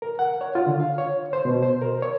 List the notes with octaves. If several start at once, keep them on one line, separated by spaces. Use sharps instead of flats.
A#4
F#5
C#5
F4
D3
F5
C#5
C5
B2
C5
A#4
C#5